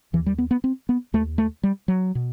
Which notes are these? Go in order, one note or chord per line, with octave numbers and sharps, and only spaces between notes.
D#2 E3
G3
B3
B3
C4
B3
D#2 A3
A3
G3
F#3
B2